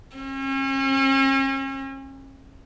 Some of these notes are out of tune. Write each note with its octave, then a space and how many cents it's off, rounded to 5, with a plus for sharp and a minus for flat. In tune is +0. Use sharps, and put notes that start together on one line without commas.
C#4 -40